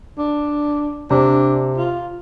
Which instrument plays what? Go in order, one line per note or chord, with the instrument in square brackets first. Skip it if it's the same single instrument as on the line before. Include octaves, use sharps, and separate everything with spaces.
[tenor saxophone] D4
[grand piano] C3 [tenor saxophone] D4
[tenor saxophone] F4